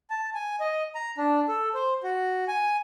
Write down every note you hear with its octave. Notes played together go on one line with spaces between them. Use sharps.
A5
G#5
D#5
A#5
D4
A4
C5
F#4
G#5